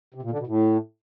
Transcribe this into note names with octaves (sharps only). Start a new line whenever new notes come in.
C3
A#2
D3
B2
A2